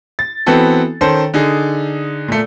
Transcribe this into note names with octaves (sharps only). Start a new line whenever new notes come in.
A6
E3 B3 C4 F#4 A4
D#3 C#4 A4 C5
D3 D#4 G#4
A#2 A3